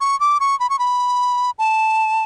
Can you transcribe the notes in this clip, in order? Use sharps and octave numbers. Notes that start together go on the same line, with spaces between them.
C#6
D6
C#6
B5
C#6
B5
A5